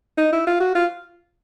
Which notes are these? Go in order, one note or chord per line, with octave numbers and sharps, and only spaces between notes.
D#4
E4
F4
F#4
F4